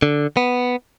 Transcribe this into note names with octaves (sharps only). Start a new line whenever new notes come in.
D3
B3